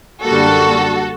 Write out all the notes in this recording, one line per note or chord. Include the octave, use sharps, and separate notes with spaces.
F#2 D3 G3 A#3 F#4 A4